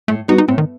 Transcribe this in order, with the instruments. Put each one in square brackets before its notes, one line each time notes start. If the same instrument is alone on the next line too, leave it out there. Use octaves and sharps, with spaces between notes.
[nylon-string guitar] A2 [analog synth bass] A3
[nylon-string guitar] G3 B3 F#4 [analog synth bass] D#4
[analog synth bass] D#4
[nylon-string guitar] A2 [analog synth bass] C4
[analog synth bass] D#3